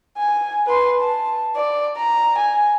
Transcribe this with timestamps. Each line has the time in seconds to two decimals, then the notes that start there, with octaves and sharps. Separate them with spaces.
0.17 G#5
0.66 B4 C6
1.01 A5
1.56 D5
1.97 A#5
2.38 G#5